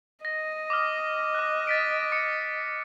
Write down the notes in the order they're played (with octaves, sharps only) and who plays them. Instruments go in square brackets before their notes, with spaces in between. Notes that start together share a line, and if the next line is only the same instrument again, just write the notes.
[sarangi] D#5 [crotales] A#6
[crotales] D6 D#6 F6
D6 F#6
A6 B6 D7
D6 C#7 D7